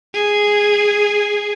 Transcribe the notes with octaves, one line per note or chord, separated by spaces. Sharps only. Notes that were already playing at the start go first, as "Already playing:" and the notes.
G#4